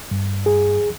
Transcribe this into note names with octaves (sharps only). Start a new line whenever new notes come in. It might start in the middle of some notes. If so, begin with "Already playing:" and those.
G2
G2 G#4